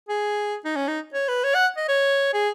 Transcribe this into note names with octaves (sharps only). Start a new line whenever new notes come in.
G#4
D#4
C#4
D#4
C#5
B4
C#5
F#5
D#5
C#5
G#4